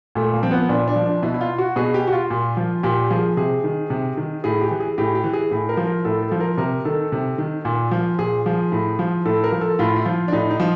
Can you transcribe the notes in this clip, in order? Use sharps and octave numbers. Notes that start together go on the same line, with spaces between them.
A#2 A3
A#3
F3 C4
B3
A#2 D4
D4
F3
D4
B2 E4
E4
F4
F#4
B2 G#4
G4
F#4
F4
A#2
F3
A#2 G4
F3 G#4
C3 G#4
D#3
C3
D#3
A2 G#4
G4
E3
G#4
A2 G4
G4
E3
G#4
A2
A#4
F3
A#4
A2 A4
A4
F3
A#4
C3 A#4
D#3 A4
C3
D#3
A#2
F3
A#2 G#4
F3
A2
F3
A2 A4
A#4
F3
A4
A2 F4
E4
F3 F4
D4
A2 D#4
D#4
F3